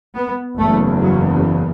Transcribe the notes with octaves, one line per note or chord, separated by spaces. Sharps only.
B3
F#1 E2 C#3 A3
F#3